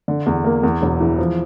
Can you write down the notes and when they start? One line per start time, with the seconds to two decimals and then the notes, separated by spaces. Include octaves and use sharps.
0.08 D3
0.27 E2
0.44 A#3
0.63 E2
0.82 E1
1.00 E3
1.18 F3